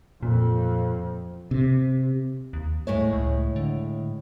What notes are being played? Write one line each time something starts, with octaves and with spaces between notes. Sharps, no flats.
F2 A#2
C3
D#2
A2 G#3 A3 C#5
C#2
D3